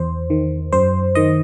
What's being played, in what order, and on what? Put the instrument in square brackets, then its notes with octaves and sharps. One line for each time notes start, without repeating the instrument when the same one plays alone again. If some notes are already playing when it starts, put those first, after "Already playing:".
Already playing: [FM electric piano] E2 C5
D#3
F#2 C5
D#3 D#5